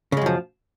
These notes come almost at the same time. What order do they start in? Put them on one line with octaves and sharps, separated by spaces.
C#3 G#3 F#2 F3